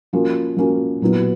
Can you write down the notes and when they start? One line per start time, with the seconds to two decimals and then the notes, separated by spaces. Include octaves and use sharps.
0.13 F3 A#3 C#4 F#4
0.57 F3 A#3 C#4 F#4
1.01 A#2 F#3 B3 E4